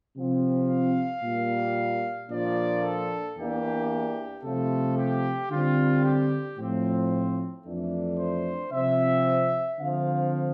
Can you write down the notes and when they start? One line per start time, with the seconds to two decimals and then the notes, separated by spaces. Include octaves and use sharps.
0.16 C3 F3 C4
0.69 F5
1.22 A#2 G3 A#3
2.30 A#2 F3 A#3 D4 D5
2.83 A4
3.37 E2 E3 A#3 D4 G4
4.44 C3 F3 A3 A4
4.98 G4
5.51 D3 G3 C4 F4
6.05 G4
6.58 A2 F3 C4
7.66 F2 E3 A3 D4
8.19 C5
8.73 C3 F3 C4 E5
9.79 D3 F3 C4 F5